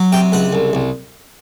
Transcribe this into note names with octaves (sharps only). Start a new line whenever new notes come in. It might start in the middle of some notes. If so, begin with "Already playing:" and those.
Already playing: F#3
C3 G5
C#2 F#5
C2
C2